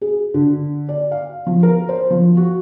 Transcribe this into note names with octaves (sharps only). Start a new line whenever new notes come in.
G#4
D3
D5
F5
F3
A#4
C5
F3
F#4